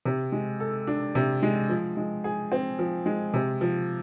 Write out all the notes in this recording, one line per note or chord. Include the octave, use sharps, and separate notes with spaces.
C3
G#3
A4
D4
C3
G#3
F3
G#3
G#4
C4
F3
G#3
C3
F3